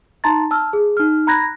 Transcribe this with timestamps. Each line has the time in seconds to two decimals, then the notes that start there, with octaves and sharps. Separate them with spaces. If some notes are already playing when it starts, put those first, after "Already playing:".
0.24 D#4 A5 A#5 C6 A6
0.51 A5 E6 F6
0.73 G#4
0.97 D#4 F6
1.27 A#5 B5 F#6 G#6 A#6